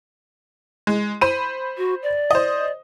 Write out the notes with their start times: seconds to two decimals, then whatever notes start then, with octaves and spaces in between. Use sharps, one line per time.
0.87 G#3
1.21 C5 B5 D#7
1.78 F#4
2.03 D5
2.31 C5 D#5